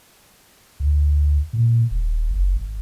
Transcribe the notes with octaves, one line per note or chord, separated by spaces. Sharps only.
D2
A#2
D#1
F#1
G#1